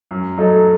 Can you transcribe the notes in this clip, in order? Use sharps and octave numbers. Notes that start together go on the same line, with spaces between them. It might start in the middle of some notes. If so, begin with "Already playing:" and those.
F#2
F#3 A3 D#4 A4